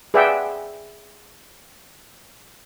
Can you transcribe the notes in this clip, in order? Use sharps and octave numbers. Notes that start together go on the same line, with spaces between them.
G#4 B4 D5 E5 F#5 G5